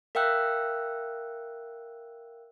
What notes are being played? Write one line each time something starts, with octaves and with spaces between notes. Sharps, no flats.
A#4 E5 F5 G5 E6 F#6